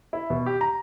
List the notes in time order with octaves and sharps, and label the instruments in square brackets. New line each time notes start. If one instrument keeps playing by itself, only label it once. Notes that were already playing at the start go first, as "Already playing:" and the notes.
[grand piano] E4
B2
G4
A#5